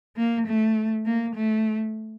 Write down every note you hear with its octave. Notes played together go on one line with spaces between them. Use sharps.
A#3
A3
A#3
A3